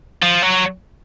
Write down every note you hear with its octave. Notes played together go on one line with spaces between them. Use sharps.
F3
F#3